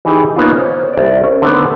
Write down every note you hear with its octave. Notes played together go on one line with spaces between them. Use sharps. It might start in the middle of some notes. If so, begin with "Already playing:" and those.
E3 D#4 G4 G#4
A#3 B3 C#4 D#4 F4
C5 C#5
C2 D5
C#4
D3 D#3 A3 B3